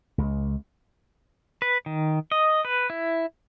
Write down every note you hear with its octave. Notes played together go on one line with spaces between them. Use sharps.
C#2
B4
D#3
D#5
B4
E4